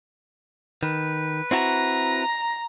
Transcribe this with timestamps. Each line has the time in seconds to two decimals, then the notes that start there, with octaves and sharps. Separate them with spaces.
0.83 D#3 B4
1.51 C4 E4 F#4 A#5